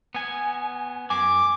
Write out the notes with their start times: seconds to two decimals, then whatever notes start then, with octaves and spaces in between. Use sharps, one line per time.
0.15 B3 G#5
1.10 F#2 G#5 D6